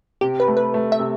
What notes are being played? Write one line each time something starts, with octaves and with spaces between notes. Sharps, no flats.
C3 G4
B4
A3
B4
A3
E5
C3